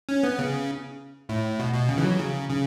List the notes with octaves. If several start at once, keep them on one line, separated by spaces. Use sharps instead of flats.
C#4
B3
C#3
A2
B2
B2
C#3
E3
F#3
C#3
C#3